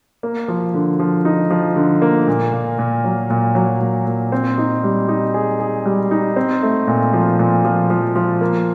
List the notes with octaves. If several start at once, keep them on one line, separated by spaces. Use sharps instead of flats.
A#3
F3
D3
F3
D#4
F3
D3
A#3
A#2
A#2
A#2
F#3
A#2
F#3
A#2
A#2
C4
D#4
G3
D#4
G#4
G#4
G3
D#4
C4
A3
A#2
F3
A#2
F3
F3
F3
A#3